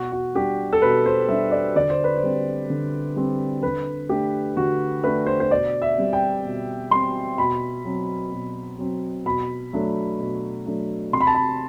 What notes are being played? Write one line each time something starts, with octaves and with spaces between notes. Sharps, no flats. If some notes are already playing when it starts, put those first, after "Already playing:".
Already playing: B2 F#4
F#4
G3 D4 G4
A4
B2 B4
C5
G3 D4 E5
D5
D3 D5
C5
B4
C5
G3 C4
D3
G3 C4
D3 B4
A3 D4 G4
D3 F#4
A3 D4 B4
C5
C5
B2 D5
E5
G3 C4
G5
B2
G3 C4 C6
B2 B5
F#3 C4
B2
F#3 C4
B2 B5
F#3 A3 D4
B2
F#3 A3 D4
C3 C6
B5
A5
B5